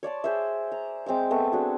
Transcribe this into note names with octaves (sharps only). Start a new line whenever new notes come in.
C#5 D5 A5 C6
G#4 C5 E5
A#5
G#3 C4 G5 D6
A3 B3 C4
D4 F#4 G#4